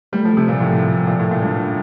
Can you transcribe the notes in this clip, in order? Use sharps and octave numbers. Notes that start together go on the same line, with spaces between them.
G3 A3
F3
C3
A#2
A2 F3
A#2
A2
A#2
G2